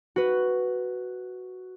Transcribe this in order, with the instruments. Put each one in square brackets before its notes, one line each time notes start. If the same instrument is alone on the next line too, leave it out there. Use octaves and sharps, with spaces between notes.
[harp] F#4 B4